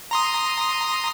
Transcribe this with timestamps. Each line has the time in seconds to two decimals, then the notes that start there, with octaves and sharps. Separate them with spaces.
0.11 A#5 C6 D#6